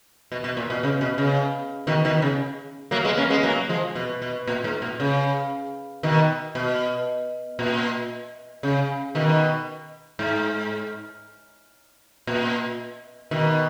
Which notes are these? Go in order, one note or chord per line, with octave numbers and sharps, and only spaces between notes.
B2
B2
A#2
B2
C#3
B2
C#3
B2 D#3
B2 D#3
C#3
F#3 A#3
G#3 B3
A#3 C#4
G#3 B3
F#3 A#3
F3 G#3
B2
B2
A#2
G#2
A#2
C#3
B2 D#3
B2
A#2
C#3
B2 D#3
G#2
A#2
B2 D#3